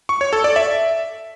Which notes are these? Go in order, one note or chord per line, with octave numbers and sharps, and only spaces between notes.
C#6
C#5
A4
D5
E5